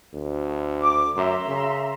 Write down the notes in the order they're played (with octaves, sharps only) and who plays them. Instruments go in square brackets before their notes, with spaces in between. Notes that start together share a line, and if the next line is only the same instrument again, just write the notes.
[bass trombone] D2
[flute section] D6
[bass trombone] F#2 [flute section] E5 A#5 C6
[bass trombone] C#3